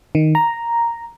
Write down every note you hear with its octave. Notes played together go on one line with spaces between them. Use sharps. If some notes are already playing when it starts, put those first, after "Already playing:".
D#3
A#5